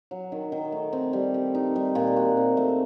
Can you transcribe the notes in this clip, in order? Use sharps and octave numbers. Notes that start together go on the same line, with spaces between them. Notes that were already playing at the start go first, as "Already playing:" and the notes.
F#3
D#3
D#3
A3
C4
G3
G4
D#4
G3
A#2
F#4
C4
A3